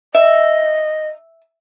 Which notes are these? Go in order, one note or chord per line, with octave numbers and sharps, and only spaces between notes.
D#5 E5